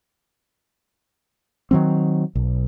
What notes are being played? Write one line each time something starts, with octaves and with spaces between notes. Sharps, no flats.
D#3 F#3 C4
B1